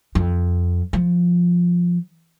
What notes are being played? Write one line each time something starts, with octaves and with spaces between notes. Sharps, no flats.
F2
F3